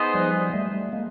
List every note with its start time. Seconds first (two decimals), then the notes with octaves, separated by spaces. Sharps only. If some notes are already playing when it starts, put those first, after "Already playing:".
Already playing: B3 D#4 G#4 C5 D#5
0.14 F3 G3
0.53 G3 A3
0.92 G#3 A#3